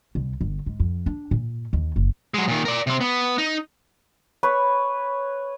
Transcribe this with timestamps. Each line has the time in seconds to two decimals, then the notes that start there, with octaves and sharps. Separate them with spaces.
0.15 C2
0.41 G1
0.66 G#2
0.80 F2
1.06 D4
1.31 A#2
1.73 D#2
1.96 F#1
2.34 F#3 G#3
2.48 A#2 D#3
2.65 A#4 D5
2.87 C3 C4
3.01 B3
3.38 D#4
4.43 B4 C#5